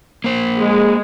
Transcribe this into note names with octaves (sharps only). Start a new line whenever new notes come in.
A#3 C5
G#3